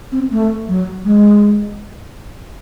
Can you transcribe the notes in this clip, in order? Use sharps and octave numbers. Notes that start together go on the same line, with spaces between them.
C4
A3
F#3
G#3